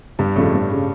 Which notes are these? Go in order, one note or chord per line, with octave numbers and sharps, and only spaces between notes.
G1 G2 G3
F2 A2 C#3 A3
G1
C#3